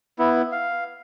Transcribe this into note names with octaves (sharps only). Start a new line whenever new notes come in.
B3 E4
F5